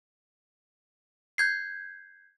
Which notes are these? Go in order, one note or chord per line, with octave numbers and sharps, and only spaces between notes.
G6 G#6 C7